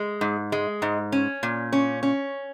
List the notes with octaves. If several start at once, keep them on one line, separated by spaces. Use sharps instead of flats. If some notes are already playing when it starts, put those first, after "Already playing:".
Already playing: G#3
G#2
G#3
G#2
C#4
A#2
C#4
C#4